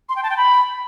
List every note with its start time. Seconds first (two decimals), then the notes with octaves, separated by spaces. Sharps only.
0.09 C6
0.16 G5
0.23 A5
0.30 G5
0.37 B5